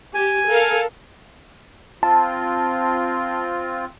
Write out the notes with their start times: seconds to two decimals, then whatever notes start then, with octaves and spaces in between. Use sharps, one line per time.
0.14 G4 G#5
0.46 A4 A#4 F5
2.03 C4 F4 A5